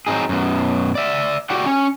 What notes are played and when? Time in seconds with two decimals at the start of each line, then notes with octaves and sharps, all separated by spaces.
0.07 F#3 C4 D#4 G#4
0.29 F#2 B2
0.95 D5 E5
1.50 F#4 G4 D5 F#5
1.66 C#4